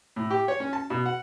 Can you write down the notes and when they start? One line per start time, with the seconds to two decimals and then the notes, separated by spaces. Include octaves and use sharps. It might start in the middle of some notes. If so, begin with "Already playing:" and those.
0.16 A2
0.30 G4
0.48 C#5
0.60 C#4
0.73 A5
0.90 B2
1.06 F#5